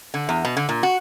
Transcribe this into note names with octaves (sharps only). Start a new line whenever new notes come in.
D3
E2
B2
D3
A#2
F#4